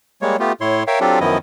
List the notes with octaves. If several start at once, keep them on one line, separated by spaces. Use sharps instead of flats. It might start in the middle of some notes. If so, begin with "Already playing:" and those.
G3 G#3 A#3 C#5
A3 B3 F4 G4
A2 E4 C#5 C6
A#4 C#5 E5 F5 G5
F#3 C4 D4 F4 G4 A4
F#2 D#3 F3 B3 E4 D#5